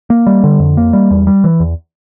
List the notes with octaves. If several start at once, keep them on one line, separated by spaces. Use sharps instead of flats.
A#3
G3
D3
F2
A#3
G3
E2
G3
E3
E2